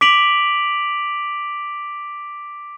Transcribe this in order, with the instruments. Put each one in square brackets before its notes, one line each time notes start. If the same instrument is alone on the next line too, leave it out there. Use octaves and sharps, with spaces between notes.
[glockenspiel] D6 B6 D7 F7 F#7